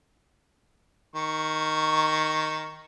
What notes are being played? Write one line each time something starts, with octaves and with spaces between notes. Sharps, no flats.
D#3 C#6